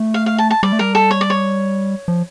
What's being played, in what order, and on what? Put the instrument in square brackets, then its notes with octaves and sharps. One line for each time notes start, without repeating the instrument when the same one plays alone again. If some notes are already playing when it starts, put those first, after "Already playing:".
Already playing: [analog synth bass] A3
[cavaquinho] F5
F5
A5
A5
[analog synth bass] G3 [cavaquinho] D5
[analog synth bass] A3
[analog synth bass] G3 [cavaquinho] A#4
[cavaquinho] A4
C#5
D5
C#5
[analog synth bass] F3